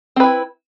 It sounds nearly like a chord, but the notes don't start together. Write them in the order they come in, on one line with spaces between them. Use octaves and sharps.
C4 B4 E4